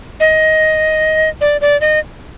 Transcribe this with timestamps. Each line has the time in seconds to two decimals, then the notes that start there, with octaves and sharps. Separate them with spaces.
0.20 D#5
1.41 D5
1.61 D5
1.81 D#5